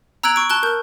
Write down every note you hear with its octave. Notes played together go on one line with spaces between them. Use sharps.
A#5 E6 F#6 G#6 D7 F#7
C#6 D7
A5 F#6 G7
A#4 G6